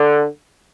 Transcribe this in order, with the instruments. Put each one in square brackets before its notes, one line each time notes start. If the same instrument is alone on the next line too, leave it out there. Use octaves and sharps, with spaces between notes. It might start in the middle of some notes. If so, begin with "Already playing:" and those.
Already playing: [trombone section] D3